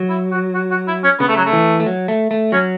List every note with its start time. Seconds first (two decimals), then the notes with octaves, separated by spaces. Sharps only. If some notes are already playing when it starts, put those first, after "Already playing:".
Already playing: F#3
0.09 E4
0.31 F#4
0.55 F#4
0.71 F#4
0.88 E4
1.04 C#4
1.19 C#3 B3
1.29 A3
1.37 F#3
1.45 A3
1.53 E3
1.80 A3
1.86 F#3
2.08 A3
2.31 A3
2.52 F#3 C#4